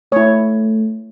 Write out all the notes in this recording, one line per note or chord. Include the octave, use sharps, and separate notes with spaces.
A3 E4 C#5